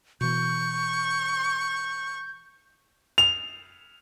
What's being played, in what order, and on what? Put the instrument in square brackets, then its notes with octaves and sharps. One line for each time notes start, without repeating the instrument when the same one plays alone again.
[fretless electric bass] B2 E3 [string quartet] C#6 [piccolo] G6
[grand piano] F7